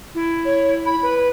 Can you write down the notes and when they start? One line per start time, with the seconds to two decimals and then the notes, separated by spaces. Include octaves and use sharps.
0.15 E4
0.45 C#5
0.86 B5
1.03 B4